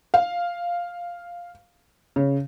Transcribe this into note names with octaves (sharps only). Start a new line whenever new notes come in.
F5
C#3